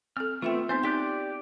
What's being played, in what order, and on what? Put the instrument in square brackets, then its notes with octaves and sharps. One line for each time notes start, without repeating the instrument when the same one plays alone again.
[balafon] C4 A4 [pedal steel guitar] F6
[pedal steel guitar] A3 B3 C4 [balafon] F4 E5 G5
[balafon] B3 C4 D#4 [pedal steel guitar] C5
[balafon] D#4 G5 [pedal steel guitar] G4 D5 F#6